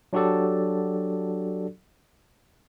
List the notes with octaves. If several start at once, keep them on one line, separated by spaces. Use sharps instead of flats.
F#3 D4 F#4 G4 A4 D5